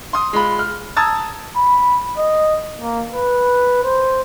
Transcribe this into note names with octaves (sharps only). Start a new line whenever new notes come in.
C6 D#6
G#3 F4 B5
F6
A5 A#5 D#6 E6 G#6 A6
B5
D#5
A#3
B4
C5